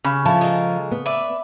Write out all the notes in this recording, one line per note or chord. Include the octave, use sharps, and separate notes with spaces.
C#3 C#4 G4 B5
F3 E4 A4 C#5 A5
G#3 A4 A#4
B3
B4 D5 E5